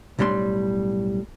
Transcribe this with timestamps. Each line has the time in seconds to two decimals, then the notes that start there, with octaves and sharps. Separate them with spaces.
0.19 B1 A2 G3 D4 C6